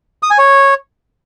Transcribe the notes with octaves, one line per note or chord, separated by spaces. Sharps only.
D#6
G#5
C#5